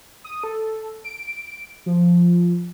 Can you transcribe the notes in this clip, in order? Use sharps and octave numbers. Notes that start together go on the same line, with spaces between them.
D#6
A4
D7
F3